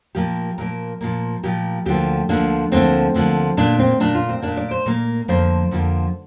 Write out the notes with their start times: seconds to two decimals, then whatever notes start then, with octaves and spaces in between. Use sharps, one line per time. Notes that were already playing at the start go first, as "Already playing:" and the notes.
0.15 A#2 F3 A#3 G4
0.58 A#2 F3 A#3 A#4
1.01 A#2 F3 A#3
1.43 A#2 F3 A#3 G4
1.86 D2 D3 F3 A#3 G4
2.29 D2 D3 F3 A#3 D4
2.72 D2 D3 F3 A#3 C4
3.15 D2 D3 F3 A#3
3.57 A#2 A#3 D4
3.79 C4
4.00 A#2 A#3 D4
4.15 F4
4.29 C4
4.42 A#2 A#3 D4
4.57 D5
4.71 C5
4.86 A#2 A#3
5.28 F2 D3 F3 A#3 C5
5.71 F2 D3 F3 A#3